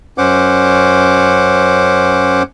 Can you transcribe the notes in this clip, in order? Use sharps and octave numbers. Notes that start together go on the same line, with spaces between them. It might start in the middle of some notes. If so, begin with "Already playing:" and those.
F#2 C#4 C5 F#5 D6